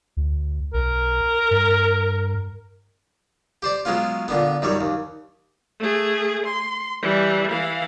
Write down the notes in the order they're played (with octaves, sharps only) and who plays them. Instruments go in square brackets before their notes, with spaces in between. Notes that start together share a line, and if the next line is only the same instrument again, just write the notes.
[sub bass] D2
[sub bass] B1 [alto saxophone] A#4
[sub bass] G2
[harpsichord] G4 C5 D5
F#3 G#3 B3 C#4 F4
A#2 D3 B3
F#2 D#3 G3 C#5
D#2
[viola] A3 G#4
C6
E3 G3
E3 F5